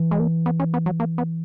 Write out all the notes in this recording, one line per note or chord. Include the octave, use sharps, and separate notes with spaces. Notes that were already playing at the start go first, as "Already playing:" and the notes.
Already playing: E3
G#3
A#3
B3
C#4
B3
F#3
A#3
B3